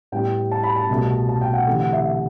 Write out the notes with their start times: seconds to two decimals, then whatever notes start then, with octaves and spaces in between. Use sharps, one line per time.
0.12 A2 G3 B3 G5
0.51 A5
0.63 B5
0.76 A5
0.89 C2 B2 A3
1.29 A5
1.41 G5
1.53 F#5
1.66 D2 C3 E3 A3 A4
1.80 F#5
1.93 E5
2.05 E5